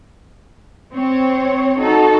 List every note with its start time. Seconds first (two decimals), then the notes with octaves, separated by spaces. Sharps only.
0.93 C4 C#5
1.79 D#4 F#4 A4